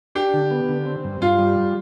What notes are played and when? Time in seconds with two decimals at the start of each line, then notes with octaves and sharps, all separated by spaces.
0.15 D4 G4
0.34 D3
0.51 B3
0.69 D3
0.86 C4
1.04 G2
1.21 G2 F4
1.39 G3